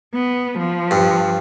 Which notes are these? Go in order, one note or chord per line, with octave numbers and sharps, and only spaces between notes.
B3
F3
G2